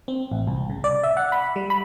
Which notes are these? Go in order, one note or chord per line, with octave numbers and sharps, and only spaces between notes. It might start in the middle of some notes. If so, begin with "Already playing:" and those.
C4
A1
C2
C#3
D5
E5
F#5
B5
G3
B5